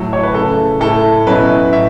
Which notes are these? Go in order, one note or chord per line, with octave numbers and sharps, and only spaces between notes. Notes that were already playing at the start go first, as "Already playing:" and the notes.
Already playing: A2 F#3 A3 E4 A4
C#5
B4
C#3 A3 E4 A4
A2 A3 E4 A4
B2 F#3 C#4 E4 B4
A2 E5